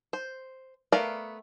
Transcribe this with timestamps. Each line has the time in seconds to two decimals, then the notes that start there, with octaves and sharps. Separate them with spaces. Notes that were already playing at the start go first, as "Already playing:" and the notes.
0.13 C5
0.92 A3 B3 A#4 D5 F5